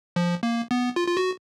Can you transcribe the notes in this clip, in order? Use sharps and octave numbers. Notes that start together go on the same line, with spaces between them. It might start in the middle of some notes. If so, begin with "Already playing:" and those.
F3
A#3
B3
F4
F4
F#4